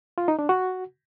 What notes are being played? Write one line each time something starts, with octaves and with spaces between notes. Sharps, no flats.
F4
D#4
D4
F#4